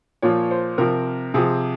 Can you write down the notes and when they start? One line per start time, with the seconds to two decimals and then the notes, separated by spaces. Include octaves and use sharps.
0.22 A#2 F3 C#5
0.51 C5
0.78 C3 F3 A#4
1.34 C3 F3 G#4